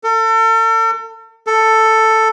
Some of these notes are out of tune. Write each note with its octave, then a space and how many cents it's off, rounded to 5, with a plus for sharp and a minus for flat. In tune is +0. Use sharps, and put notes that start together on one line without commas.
A4 +40
A4 +10